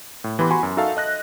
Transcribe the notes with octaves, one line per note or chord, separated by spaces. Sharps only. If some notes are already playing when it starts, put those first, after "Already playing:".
A2
E3 B3 G4 B5 C6
F#4 G#5 B5 C6
F#2
D#4 F#4 A4 E5 F5 A5
D#5 F#6 A#6